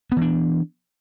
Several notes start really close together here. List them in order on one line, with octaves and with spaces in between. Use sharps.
B3 E3 D4